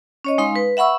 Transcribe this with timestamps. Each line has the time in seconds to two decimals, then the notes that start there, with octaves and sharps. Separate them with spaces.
0.25 C#4 C#5 D#5
0.38 G#3 D#4 F5 C6
0.56 B4
0.77 E5 F#5 B5 C#6 E6